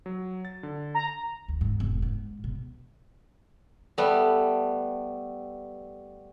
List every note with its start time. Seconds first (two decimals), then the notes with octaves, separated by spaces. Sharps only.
0.06 F#3
0.45 A6
0.63 D3
0.95 A#5
1.49 D#2
1.61 G#2
1.80 E1
2.02 G#2
2.44 B2
3.98 G3 A3 B3